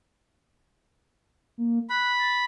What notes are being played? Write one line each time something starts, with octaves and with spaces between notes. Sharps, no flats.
A#3
B5 F#6
A6